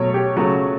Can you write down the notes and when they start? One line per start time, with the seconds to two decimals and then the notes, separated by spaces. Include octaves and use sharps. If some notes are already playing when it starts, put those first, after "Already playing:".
Already playing: B2 F#3 A3 C#5
0.14 G4
0.36 C#3 F#3 A3 F#4